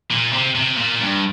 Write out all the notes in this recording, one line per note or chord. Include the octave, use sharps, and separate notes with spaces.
A#2
C3
C3
A#2
G2